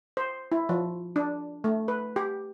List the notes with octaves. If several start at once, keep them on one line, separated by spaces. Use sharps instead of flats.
C5
E4
F3
D4
A3
B4
G4